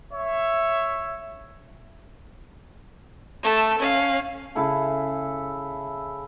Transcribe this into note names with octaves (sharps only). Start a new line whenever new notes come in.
C#5 E5
A3 A4
C#4 F5
C#3 E4 G#4 A4